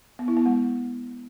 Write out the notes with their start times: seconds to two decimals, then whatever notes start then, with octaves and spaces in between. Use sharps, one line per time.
0.19 B3
0.28 E4
0.37 B3
0.46 G#3